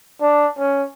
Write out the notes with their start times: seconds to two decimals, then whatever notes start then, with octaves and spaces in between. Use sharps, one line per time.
0.21 D4
0.59 C#4